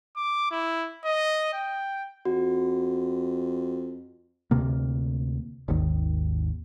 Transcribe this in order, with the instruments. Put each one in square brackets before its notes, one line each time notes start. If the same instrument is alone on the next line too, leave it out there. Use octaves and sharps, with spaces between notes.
[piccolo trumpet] D6
E4
D#5
G5
[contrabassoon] F2 [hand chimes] F#4
[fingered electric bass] D2 C3 A#3
G#1 D#2 D#3